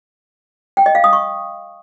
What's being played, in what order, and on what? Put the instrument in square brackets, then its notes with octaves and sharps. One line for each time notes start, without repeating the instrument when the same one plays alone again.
[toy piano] G5
D#5
F5
D#6
C#6